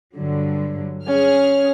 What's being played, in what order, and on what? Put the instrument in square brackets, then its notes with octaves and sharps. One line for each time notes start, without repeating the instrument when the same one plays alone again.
[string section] G2 D3 F#3
[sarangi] C#4 [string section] G#4 F6